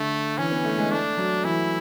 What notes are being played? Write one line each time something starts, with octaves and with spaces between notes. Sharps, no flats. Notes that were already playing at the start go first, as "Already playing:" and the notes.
Already playing: D3 A3
E3 C#4
B3
A3
G#3
A3 D4
F#3
E3 E4